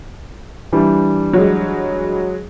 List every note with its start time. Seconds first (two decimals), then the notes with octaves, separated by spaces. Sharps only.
0.72 E3 G3 D4
1.33 F#3 G#3